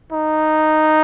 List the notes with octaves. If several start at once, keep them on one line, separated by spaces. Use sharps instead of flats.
D#4